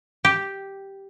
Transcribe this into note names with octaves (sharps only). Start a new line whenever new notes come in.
G4